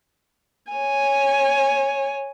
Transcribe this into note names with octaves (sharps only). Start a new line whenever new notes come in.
C#5 G#5